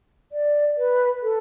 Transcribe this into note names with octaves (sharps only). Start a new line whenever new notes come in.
D5
B4
A4